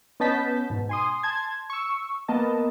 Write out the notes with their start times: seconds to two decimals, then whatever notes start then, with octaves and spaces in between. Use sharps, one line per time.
0.20 B3 C#4 D#5 A5 G6 B6
0.70 G#2 B2
0.89 G#5 C6 D#6
1.23 A5 C6 G#6
1.70 C#6 E6
2.28 A#3 B3 A#4 D#5 A5